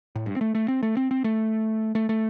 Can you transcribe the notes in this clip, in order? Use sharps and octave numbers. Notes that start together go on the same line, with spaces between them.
A2
G2
C4
A3
A3
C4
A3
C4
C4
A3
A3
A3